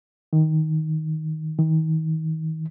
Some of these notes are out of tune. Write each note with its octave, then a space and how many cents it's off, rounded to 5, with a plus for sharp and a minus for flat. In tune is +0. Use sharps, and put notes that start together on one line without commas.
D#3 +10
D#3 +35